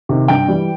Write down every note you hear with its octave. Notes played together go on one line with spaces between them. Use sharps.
C3 D#3
G2 G5
E3 G3